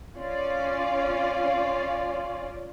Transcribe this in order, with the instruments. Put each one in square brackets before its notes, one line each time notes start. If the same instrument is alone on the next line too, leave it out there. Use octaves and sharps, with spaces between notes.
[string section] C#4 F4 D5